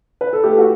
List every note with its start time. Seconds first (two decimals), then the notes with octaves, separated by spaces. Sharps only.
0.21 B4
0.33 A4
0.44 A3 G4
0.58 F#4